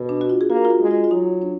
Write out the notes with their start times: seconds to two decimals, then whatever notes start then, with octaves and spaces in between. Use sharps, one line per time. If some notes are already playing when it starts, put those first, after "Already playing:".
Already playing: B2
0.09 D4
0.21 F#4
0.30 F4
0.41 G#4
0.50 A#3 F#4
0.65 F4
0.70 F#4
0.80 G#3
0.91 F4
1.04 F4
1.11 F#3 D#4
1.42 D4